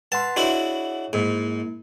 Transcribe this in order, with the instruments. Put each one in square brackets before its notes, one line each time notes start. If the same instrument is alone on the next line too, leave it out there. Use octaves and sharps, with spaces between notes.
[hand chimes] B4 F#5 C6 [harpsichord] A5
[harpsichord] D4 E4 F#4 [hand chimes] G#4 C#5 D#5
[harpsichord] G#2 [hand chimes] A#3 E4